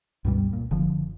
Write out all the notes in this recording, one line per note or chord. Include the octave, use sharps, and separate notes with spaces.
C#2 G2 B2 G3
A#2
F#1 D3 F3